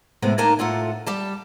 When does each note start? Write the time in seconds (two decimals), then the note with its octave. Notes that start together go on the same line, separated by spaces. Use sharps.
0.22 A2 C3 G#3 B3
0.38 A#3 D4 D#4 A#4 G#5 A5
0.59 A2 F4 A4 F#5
1.06 G3 G4 A5